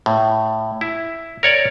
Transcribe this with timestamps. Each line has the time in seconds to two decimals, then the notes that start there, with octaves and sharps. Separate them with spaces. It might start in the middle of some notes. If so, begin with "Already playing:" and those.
0.06 A2
0.81 E4
1.43 A#4 C#5 D5